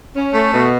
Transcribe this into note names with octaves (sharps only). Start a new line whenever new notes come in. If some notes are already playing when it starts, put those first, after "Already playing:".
C#4
A3
B2